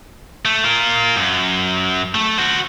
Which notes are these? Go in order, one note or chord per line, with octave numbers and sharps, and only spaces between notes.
A3
F4 A#4
F#2
A3
F#4 C5